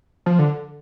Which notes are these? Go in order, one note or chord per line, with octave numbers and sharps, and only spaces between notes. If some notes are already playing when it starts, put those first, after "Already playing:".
F3
D3